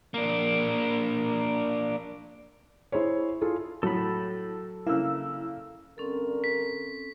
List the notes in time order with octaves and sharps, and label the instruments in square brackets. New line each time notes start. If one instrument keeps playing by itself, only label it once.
[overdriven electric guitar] A#3 D4
[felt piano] E4 G#4 C5 C#5
E4 F4 G#4 A4
[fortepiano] A2 [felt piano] F#3 [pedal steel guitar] A4 B5
[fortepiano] C#3 A#3 [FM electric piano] E4 E6
[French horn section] G2 D3 A#4 [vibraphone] C4 C#4 A4
[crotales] B6